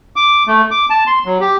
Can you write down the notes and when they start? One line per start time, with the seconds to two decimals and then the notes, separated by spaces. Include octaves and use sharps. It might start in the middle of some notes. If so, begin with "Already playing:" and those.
0.16 D6
0.47 A3
0.71 D6
0.90 A5
1.07 C6
1.26 F#3
1.41 G4